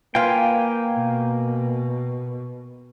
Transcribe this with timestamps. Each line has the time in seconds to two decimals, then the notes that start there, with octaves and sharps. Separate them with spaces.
0.15 A#3 F4 B4 F5 G5 G#5
0.93 B2